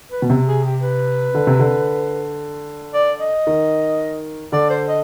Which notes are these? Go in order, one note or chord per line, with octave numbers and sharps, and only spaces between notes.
B4
B2
C3
G#4
G4
B4
D3
C3
D3
D5
D#5
D#3
D3 D5
C5
D#5